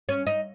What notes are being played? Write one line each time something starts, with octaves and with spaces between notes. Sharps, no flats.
C#4
D#4